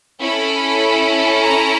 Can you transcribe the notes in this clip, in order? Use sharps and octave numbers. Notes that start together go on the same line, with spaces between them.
C#4 E4 A4 B5
A#5